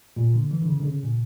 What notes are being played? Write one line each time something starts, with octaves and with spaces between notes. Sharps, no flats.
A#2
D3
E3
D3
C#3
D3
C#3
A#2